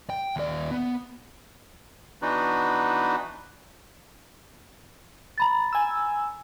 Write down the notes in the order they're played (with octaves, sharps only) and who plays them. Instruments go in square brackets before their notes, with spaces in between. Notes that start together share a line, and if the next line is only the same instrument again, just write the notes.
[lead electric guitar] G5
D#2 D5
B3
[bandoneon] E3 B3 D4 D#4 F#4 B4
[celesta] A#5 B5 A6
[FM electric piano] G#5 E6